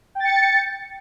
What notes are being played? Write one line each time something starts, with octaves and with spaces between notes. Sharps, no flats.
G5 A6 C#7